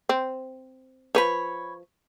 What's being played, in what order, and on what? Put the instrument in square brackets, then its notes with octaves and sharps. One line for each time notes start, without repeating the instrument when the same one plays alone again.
[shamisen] C4
[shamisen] F3 B4 [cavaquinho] C#5 B5